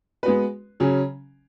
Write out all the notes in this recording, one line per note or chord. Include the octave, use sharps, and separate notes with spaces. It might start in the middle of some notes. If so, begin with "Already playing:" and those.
G#3 B3 F#4 B4
C#3 F#3 C#4